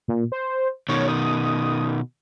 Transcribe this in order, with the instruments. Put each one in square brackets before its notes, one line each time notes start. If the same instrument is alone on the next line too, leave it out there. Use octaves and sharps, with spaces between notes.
[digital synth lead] A#2
C5
[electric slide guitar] B2 D#3 [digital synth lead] C#5
[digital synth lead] D#6